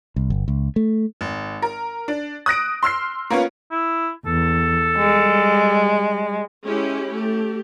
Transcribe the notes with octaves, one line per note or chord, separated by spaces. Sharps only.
C2
G1
C#2
A3
G#1
A#4
D4
D#6 F#6 A#6 D7
C6 E6 F6 C7
A#3 B3 C#4 F4
E4
E2 A4
G3 G#3
G#3 C#4 E4 G4
A3 G4